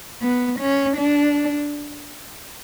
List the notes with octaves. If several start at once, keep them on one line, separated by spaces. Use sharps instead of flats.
B3
C#4
D4